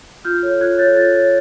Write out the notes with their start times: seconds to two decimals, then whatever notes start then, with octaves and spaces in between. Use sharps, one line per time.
0.25 F4 F6 G6
0.43 A4 C#5
0.61 F4 F#6 G#6
0.78 A4 C#5 G6 A6
0.97 F4 G6 A6
1.14 A4 C#5